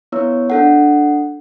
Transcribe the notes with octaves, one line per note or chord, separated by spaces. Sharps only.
B3 E4 C#5 E6
D4 A4 F#5